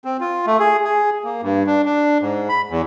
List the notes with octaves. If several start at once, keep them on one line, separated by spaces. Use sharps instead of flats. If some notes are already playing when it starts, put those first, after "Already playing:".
C4
F4
A3
G#4
G#4
A#3
G2
D4
D4
G#2
B5
E2